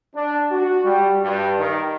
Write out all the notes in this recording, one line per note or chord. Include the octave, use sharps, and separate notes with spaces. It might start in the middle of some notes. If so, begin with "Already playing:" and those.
D4
F#4
G3
G2
D#3